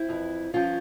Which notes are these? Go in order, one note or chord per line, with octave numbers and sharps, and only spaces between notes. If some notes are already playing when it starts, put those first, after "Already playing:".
Already playing: C4 E4
F2 E3
G2 F3 C#4 F4